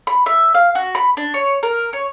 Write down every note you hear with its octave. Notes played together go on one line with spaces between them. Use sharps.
B5
E5
F5
F#4
B5
D4
C#5
A#4
C#5